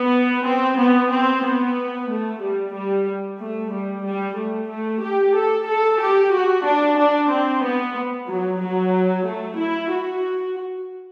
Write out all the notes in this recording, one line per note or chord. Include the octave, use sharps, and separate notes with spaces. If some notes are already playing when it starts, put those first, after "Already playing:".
Already playing: B3
C4
B3
C4
B3
A3
G3
G3
A3
G3
G3
A3
A3
G4
A4
A4
G4
F#4
D4
D4
C4
B3
F#3
F#3
A3
E4
F#4